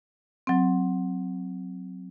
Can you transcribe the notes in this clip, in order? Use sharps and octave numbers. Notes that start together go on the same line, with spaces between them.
F#3 C4